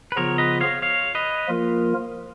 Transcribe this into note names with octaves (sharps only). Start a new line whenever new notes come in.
B4
C#3 F3 B3 F4 G#4 A#4 C#5
B4 D#5
C#5 F5
C#5 F5
B4 D#5
F3 A#3 F4 A#4